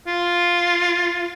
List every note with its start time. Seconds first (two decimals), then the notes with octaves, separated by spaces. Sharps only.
0.07 F4